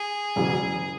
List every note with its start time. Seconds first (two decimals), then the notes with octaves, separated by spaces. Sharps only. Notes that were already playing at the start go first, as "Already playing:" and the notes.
Already playing: G#4
0.36 E1 E2 C#3 F#3